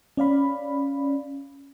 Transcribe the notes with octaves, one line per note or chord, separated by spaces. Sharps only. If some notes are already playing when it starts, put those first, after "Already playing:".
C#4 D5 F5 B5